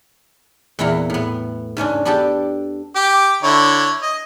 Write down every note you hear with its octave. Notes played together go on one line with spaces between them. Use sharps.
E2 A#2 C4 E4 F#5 A#5
A2 B3
G#2 C#3 C#4 D4
B3 D4 G4 A4 G5 A5
G4 D6
D3 E4 C#5
D#5